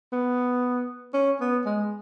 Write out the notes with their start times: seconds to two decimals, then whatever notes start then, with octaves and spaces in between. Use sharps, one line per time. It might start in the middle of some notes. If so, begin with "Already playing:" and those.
0.12 B3
1.14 C#4
1.41 B3
1.66 G#3